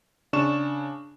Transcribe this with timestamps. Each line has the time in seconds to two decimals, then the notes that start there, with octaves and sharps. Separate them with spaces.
0.33 C#3 D4 C#6 E7